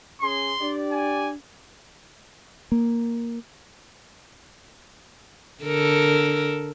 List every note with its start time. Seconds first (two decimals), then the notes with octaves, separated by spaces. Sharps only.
0.21 C#4 G#4 C6
0.60 D4 G4 D5
0.91 G#5
2.72 A#3
5.64 D3 A4 A#4